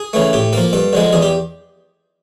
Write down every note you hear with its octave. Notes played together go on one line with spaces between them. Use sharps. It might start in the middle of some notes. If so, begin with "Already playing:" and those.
Already playing: G#4
C#3 E3 A3
A2 G4
F3 A#3 A4
G2 A4
D3 F3 G#3
E2 G#4
G4